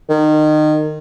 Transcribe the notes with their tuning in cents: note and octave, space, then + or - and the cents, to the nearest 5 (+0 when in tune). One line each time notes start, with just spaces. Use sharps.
D#3 -25